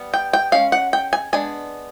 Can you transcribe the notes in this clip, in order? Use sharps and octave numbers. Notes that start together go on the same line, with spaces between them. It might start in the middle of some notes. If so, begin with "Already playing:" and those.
Already playing: G3 B3
G5
G5
G#3 C#4 F5
F#5
G5
G#5
G#3 B3 D4 G#5